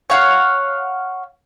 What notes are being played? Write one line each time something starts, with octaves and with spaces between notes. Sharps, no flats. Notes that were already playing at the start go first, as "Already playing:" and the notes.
C#5 F5 F#5